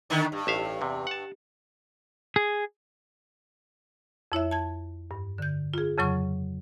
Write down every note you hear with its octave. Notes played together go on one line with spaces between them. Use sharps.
D3 D#3 B3
G2
A1 E5 F5
E2 C3
F#5 A5
G#4
F2 E4 C#5 E5
A5 G#6
G2
D3 G6
F4 G#4
F2 C#3 F#3 C#6